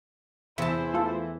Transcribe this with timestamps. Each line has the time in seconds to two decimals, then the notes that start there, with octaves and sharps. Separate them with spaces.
0.58 E2 C3 E3 E4 C5 E5 A5
0.94 A3 F4 A4